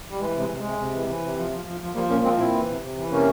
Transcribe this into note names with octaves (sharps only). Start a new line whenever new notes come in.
G3
E3 G#3
C3
G#3
C3
G#3
C3
C3
E3
E3
C3
F3
F3
F3
F3
F3 G3 A#3
A#2 A#3 C#4
F3 G#3 C4
A#2 C4 E4
E3
C3
C3
E3
C3 A#3 C#4